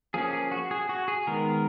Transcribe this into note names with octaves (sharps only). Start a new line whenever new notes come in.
F3 A#3 C#4 G#4
G#4
F#4
G#4
F#4
G#4
D#3 G#3 B3 A#4